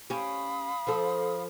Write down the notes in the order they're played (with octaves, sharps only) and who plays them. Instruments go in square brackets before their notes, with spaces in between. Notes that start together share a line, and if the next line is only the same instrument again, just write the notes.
[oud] C#4 G4 [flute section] F5 B5 D#6
[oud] F3 A4